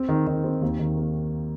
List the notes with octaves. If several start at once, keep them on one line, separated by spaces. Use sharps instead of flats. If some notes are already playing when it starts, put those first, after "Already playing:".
Already playing: C4
D#3
D#3
C4
D#2
D#3
A#3